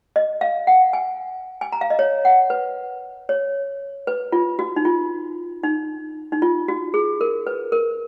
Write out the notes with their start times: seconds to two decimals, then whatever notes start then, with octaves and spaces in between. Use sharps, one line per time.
0.16 D#5
0.41 F5
0.67 F#5
0.93 G#5
1.61 G#5
1.72 A#5
1.81 F5
1.90 D#5
1.99 C#5
2.25 F#5
2.50 B4
3.29 C#5
4.07 B4
4.32 F4
4.59 F#4
4.76 D#4
4.85 F4
5.63 D#4
6.32 D#4
6.42 F4
6.68 F#4
6.94 G#4
7.21 A#4
7.47 B4
7.72 A#4